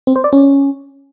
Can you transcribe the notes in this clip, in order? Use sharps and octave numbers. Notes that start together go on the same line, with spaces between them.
C4
C5
D5
C#4